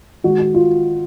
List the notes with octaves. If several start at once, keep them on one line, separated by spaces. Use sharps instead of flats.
D#3 G#3 F#4
F#4
F4